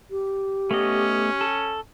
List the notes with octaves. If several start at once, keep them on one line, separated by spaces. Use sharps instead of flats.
G4
A3 B3 C#4 D#5
A4